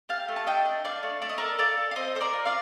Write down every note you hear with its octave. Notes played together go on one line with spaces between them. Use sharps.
G4 F5 A5
A3
A5
D4 D#5 G5
D4
D4 D5 F5
A3
A3 D5
D#5
A4 A#4 D5
A4 D5 F5
A4
F5
C4 C5 D#5
A4 C5
A#4 D5
F4
D5 F5